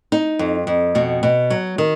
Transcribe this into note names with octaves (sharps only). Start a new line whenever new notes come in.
D#4
F2
F2
B2 F#4
B2
F#3
D#3